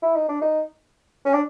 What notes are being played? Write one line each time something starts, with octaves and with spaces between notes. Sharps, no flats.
E4
D#4
D4
D#4
C#4
D4